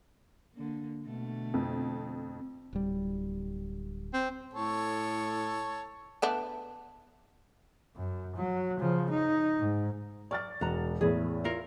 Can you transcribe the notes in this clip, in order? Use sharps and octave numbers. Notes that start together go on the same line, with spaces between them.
D3 A#3
B2 D3 A3
F2
D1 G3
C4
A2 A4 C#5
A3 B3 D4
F#2
F#3
C#3 F3
D#4
G#2
D5 C#6 F6 A6
E1 F#4 A#5
E2 A2 G#4 B4
E4 F4 A#4